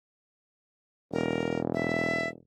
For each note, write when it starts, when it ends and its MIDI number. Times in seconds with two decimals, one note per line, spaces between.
1.13 2.37 28
1.13 1.60 70
1.74 2.28 76